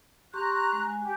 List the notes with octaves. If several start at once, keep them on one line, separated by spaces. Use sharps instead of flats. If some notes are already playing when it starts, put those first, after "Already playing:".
G4 A#5 C6 C#6 F#6
G#3
G#5
G4